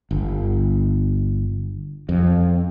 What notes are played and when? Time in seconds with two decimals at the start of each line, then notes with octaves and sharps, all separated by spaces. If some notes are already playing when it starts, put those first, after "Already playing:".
0.11 G1
2.09 F2